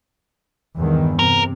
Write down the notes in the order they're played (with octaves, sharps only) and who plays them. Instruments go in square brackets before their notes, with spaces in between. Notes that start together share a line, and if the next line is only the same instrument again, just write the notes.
[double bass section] E2 G2 D#3
[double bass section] C3 [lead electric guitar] A#4